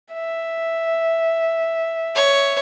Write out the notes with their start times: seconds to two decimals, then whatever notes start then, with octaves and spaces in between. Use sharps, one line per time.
0.13 E5
2.16 C#5